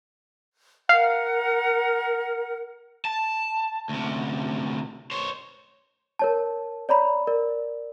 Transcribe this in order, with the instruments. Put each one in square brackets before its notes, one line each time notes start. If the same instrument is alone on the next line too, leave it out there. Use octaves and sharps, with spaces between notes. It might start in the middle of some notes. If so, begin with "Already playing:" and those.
[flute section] A#4 F#5 [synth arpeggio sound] F5
[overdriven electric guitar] A5
D2 C3
C5 C#5
[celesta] A#4 C#5 A5
C#5 D5 A#5 B5
A#4 D5